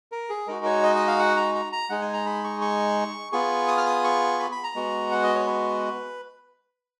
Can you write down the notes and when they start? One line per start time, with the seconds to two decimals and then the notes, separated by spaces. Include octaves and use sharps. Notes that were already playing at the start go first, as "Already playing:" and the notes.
0.12 A#4
0.29 G#4
0.47 G#3 D#4 F#4 A#4
0.65 C#5
0.83 D#5
0.95 D#5
1.07 F5
1.19 F#5
1.37 A#5
1.55 A#5
1.73 A#5
1.90 G#3 D#4 G#4 F#5
2.01 G#5
2.13 A#5
2.26 B5
2.44 C#6
2.61 C#6
3.32 B3 F4 G#4 C#6
3.68 D#6
3.77 F6
3.86 D#6
4.04 C#6
4.39 B5
4.52 B5
4.64 A#5
4.75 G#3 B3 F#4
5.11 F#5
5.23 D#5
5.35 C#5
5.46 B4